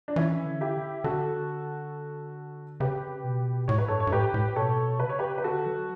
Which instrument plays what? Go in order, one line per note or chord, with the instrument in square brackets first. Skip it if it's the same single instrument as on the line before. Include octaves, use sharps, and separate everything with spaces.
[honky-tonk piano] D4
[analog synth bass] E3 [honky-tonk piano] C#4 E4
[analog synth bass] D3
[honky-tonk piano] E4 G4
[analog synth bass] D3 [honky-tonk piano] F#4 A4
[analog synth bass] C#3 [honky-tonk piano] G4 B4
[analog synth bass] B2
[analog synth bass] A2 [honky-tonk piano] C#5
[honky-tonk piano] B4
[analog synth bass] G2 [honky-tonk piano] A4 C#5
[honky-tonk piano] C#5
[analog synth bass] G2
[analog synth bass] A2 [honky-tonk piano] G4 B4
[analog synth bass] A2
[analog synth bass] B2 [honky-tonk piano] A4 C#5
[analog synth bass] C#3 [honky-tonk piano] B4
[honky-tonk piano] C#5
G4 B4
B4
[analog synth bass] D3 [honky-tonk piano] F#4 A4
[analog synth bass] F#3